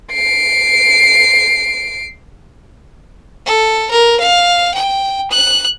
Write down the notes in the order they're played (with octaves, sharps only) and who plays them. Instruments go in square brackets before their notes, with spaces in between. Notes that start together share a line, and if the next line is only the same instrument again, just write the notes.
[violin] C7 D7
[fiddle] A4
A#4
F5
G5
F#6